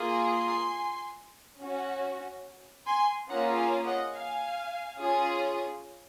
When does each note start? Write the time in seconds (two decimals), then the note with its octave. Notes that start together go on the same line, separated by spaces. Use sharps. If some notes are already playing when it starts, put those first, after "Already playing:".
Already playing: A#3 F4 G#4
0.32 G#5 C6
1.59 C#4 F#4
2.86 G#5 C6
3.29 A#3 C#4 F4 G#4 F#5 A#5
3.57 F5 G#5
3.85 D#5 F#5
4.14 F5 G#5
4.99 C#4 F4 G#4